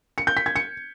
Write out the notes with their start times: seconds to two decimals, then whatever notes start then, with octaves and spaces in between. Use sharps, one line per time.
0.18 C#7
0.27 G6
0.37 B6
0.46 G#6
0.56 C#7